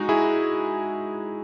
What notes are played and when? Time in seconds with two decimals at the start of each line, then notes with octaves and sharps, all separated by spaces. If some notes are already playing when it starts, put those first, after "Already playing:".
Already playing: G#3 D#4 F#4
0.09 E4 G#4